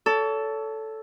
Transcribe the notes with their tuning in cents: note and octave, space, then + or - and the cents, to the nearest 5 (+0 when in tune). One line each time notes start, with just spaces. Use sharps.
A4 +0 C#5 +35